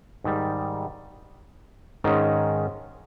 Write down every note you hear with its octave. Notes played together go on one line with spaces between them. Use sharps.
G#2 D#3 G3
G#2 D#3 G#3 C#4